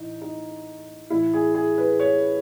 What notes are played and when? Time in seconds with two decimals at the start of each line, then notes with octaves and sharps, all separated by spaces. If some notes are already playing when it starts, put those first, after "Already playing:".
Already playing: A2 E3 D#4
0.22 D#4
1.10 A2 E3 E4
1.34 G#4
1.55 G#4
1.78 B4
2.00 C#5